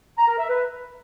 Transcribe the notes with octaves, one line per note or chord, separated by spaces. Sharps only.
A#5
A#4
E5
B4